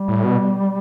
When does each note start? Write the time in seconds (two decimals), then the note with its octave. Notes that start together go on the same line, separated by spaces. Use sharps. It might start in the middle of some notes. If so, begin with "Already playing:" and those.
Already playing: G3
0.08 A2
0.24 B2